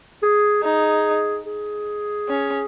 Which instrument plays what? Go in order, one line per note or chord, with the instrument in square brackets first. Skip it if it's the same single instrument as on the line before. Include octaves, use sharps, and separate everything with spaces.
[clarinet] G#4
[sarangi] D#4 [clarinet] G#4
[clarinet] G#4
[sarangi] C#4